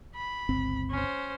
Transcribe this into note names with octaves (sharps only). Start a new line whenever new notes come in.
B5
G1 C#2 C4
C#4 C5